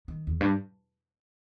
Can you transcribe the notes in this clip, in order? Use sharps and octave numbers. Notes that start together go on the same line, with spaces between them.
D#3
E2
G2